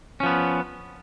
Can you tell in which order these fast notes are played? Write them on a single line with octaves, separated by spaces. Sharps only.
C#4 F3 B3